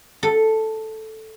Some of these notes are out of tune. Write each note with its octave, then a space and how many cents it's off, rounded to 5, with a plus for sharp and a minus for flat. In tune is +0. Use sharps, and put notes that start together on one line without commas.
A4 +0